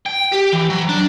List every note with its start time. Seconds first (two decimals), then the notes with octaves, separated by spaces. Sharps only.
0.06 G5
0.32 G4
0.52 E3
0.70 F#3
0.89 D4